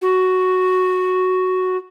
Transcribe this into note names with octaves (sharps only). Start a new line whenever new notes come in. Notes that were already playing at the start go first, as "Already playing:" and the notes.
F#4